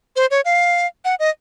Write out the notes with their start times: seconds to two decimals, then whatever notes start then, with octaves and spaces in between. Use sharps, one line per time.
0.16 C5
0.31 C#5
0.45 F5
1.05 F#5
1.19 D#5